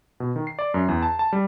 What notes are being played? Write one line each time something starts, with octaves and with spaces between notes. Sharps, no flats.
B2
D#3
C7
D5
F#2
E2
A5
A5
G3